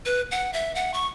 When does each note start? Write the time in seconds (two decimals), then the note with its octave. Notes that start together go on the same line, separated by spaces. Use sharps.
0.06 B4
0.31 F#5
0.53 E5
0.75 F#5
0.94 C#6